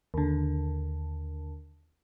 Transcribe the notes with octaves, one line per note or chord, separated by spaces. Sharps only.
D#2 D3